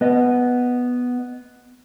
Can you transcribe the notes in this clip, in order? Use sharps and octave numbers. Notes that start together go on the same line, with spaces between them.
B3 D#5